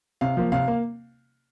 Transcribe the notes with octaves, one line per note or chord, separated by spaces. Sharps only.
C3 F5
F3 A#3
C3 F5
A#3